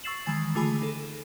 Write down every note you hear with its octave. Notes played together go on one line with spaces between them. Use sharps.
C#6 E6 A6 C7 E7 F#7
D#3 E3 G#3 G#5 A6
D3 A3 F4 G#4 G#5 B5
D#4 A4